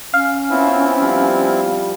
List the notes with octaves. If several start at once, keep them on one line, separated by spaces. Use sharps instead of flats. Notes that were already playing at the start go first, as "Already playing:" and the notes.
C#4 F5
B3 C4 E4 F4 C5 C#5
F3 G3